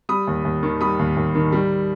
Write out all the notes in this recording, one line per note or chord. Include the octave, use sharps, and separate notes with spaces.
G3 B5 D#6
D#2
D#2
D#3
G3 B5 D#6
D#2
D#2
D#3
G3